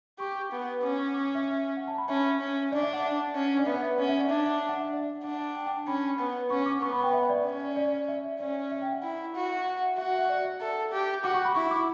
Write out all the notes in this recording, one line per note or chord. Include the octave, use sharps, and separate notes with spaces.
G4 C#6
B3
C#4 D6
C#6
D6
C#6
E5
E5
F#5
A5
B5
C#4 E5
C#4
D4 D5
E5
F#5
C#4
D5
B3 E5
E5
C#4 F#5
E5
D5
D4 E5
E5
F#5
E5
D5
D4 F#5
G5
G5
A5
C#4 B5
B3
C#4 C#6
D6
B3 C#6
B5
G5
E5
D5
C#4
D5
E5
C#4 D5
E5
G5
F#5
E4
F#4
E5
F#4 E5
E5
E5
D5
E5
A4
G4
F#4 D6
C#6
B5
E4 C#6
D6